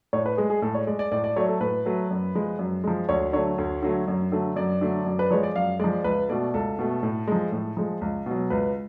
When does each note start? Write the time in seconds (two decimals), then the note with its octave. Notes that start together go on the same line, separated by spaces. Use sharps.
0.13 A2 C#5
0.26 B4
0.37 G#3 G#4
0.50 G#4
0.62 A2 A4
0.75 C#5
0.87 G#3 D5
0.99 D5
1.12 A2 D5
1.24 D5
1.36 F#3 A3 C#5
1.49 A4
1.61 A2 B4
1.86 F#3 A3
2.11 F#2
2.35 F3 G#3
2.59 F#2
2.84 F3 G#3
3.09 D2 C#5
3.33 D3 F#3 A3 C#5
3.58 D2
3.82 D3 F#3 A3
4.08 F#2
4.32 D3 F#3 A3
4.56 F#2 D5
4.81 D3 F#3 A3
5.06 F#2
5.19 B4
5.30 F3 G#3 C#5
5.43 D5
5.55 F#2 F5
5.79 F3 G#3 D5
6.04 C#2 B4
6.29 B2 A3 D5
6.54 C#2 A4
6.79 B2 A3
7.03 A2
7.27 F3 G#3
7.52 A2
7.77 F3 G#3
8.01 C#2
8.26 B2 F#3
8.50 C#2 B4